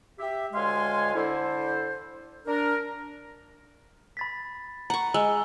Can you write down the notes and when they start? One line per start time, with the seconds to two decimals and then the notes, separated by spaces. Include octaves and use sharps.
0.19 G4 E5
0.53 D2 G#3 C#5 F5 G#5 C6
1.15 D3 E4 A4 C5
2.47 D4 A#4
4.17 B5 A6 B6
4.90 F#5 A#5 C#6
5.14 G#3 E6